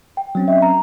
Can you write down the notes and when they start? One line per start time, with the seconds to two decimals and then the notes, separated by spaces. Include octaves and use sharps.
0.17 G5
0.35 F#3 C4 C#4
0.48 D#5 E5
0.62 A#5